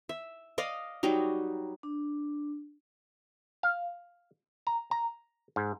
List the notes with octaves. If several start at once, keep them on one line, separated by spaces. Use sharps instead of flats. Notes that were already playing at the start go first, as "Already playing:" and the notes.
E5
D5 D#5 F5
F#3 G3 D#4 F#4
D4
F5
A#5
A#5
G#2